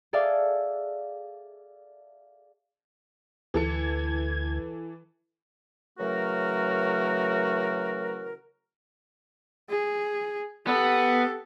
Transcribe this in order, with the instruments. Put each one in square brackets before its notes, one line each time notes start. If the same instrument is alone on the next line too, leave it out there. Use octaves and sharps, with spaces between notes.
[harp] G#4 A4 D5 E5 F5
[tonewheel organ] D2 G#6 [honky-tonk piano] E3 A4 C#7
[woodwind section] C#3 E3 F#3 A3 F#4 A#4
[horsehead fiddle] G#4
[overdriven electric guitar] B3 [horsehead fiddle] G4 A4